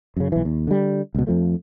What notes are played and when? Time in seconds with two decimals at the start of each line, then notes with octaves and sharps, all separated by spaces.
0.17 F#2 C#3
0.32 B1 E3
0.45 D#2
0.67 D3 G3
1.15 C#2 B2
1.27 F2 F3 A3